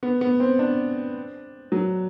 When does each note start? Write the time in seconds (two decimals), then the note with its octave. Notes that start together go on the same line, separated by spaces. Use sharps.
0.03 B3
0.21 B3
0.40 C4
0.59 D4
1.72 F#3